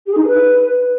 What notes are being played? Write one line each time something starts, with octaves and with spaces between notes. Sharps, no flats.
G4
G#4
D#4
G#4
B4